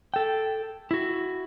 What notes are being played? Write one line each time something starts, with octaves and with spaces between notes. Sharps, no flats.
A4 G5
E4 F#4